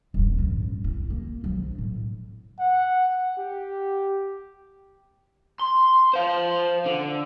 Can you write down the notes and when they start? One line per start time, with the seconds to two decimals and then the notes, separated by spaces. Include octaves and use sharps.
0.14 D#1 G2
0.38 A1 F3
0.84 E2 E4
1.10 A#3
1.44 F3 F#3
1.78 A2
2.59 F#5
3.38 G4
5.59 C6
6.14 C5 F5
6.86 D3